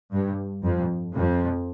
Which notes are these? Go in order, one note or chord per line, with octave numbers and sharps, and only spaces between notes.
G2
F2
F2